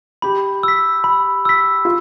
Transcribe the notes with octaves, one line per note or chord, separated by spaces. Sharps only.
G4 B5
E6 B6
B5
E6 B6
F4